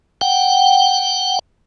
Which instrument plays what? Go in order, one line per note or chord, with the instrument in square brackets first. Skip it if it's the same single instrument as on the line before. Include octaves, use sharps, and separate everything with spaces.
[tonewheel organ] F#5 G5